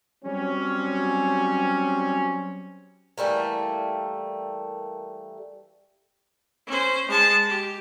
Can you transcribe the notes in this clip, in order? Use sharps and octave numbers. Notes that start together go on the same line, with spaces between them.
F#3 G3 C4 C#4
E3 G3 A3 A#3
C#4 C5
G#3 A5
G4